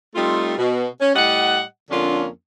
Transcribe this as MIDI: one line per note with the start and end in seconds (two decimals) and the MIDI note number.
0.16 0.53 55
0.16 0.53 57
0.16 0.53 60
0.16 0.53 63
0.16 0.53 65
0.58 0.86 47
1.00 1.12 61
1.15 1.62 45
1.15 1.62 55
1.15 1.62 75
1.15 1.62 78
1.91 2.26 41
1.91 2.26 50
1.91 2.26 58
1.91 2.26 61
1.91 2.26 62
1.91 2.26 65